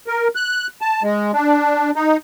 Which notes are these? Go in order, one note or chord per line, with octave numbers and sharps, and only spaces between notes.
A#4
F#6
A5
G#3
D4
D#4